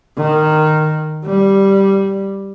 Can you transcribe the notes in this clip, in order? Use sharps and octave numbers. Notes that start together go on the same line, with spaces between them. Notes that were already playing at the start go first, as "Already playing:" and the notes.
D#3
G3